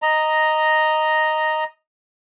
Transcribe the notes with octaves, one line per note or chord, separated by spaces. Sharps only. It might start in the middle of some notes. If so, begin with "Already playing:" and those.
D#5 A#5